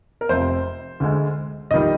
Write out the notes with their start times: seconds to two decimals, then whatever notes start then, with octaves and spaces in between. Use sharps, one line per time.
0.21 A#4
0.29 F1 F2 C3 C5
1.00 D2 D3 G#3
1.71 A#1 D#3 G3 D#5